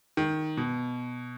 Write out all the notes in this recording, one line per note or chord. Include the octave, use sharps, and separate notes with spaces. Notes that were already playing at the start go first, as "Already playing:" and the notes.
D#3
B2